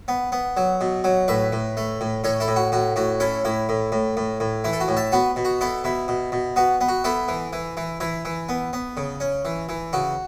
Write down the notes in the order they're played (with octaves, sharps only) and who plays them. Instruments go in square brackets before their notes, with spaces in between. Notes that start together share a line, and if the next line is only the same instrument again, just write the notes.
[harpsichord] B3
B3
F#3
B2
F#3
A2 B4 E5
A2
A3
A2
A2 A4 C#5
E4 A4
A2
F#4
A2 F#4
A2 F#4
C#4 E4 A4
A2 E4
A2
A2
A2
A2
E3 E4
A4
F#4
A2
E5 A5
B3 F#4 B4
B2
F#4
B3 E4 A4
B2 E4
B2
B2
B3 F#4
B3
F#4
B3 E4 A4
E3
E3
E3
E3 E4
E3
B3
B3
C#3
C#4
E3
E3
C#3 F#4